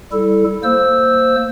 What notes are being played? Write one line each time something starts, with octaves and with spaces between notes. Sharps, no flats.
G3 E4 A4
A#3 C5 E6